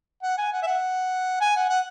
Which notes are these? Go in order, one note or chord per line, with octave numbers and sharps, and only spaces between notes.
F#5
G#5
F#5
E5
F#5
G#5
F#5
F#5